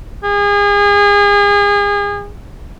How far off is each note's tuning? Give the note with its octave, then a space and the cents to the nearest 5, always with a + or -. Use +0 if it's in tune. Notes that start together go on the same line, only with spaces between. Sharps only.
G#4 -35